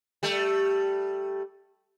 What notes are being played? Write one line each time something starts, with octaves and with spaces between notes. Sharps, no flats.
G3 A3